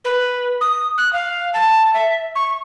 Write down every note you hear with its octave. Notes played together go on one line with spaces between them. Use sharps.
B4
D#6
F#6
F5
A5
E5
C#6